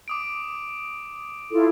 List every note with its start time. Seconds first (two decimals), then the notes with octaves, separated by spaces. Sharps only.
0.08 D6 D#6 D7
1.51 E4 F4 A4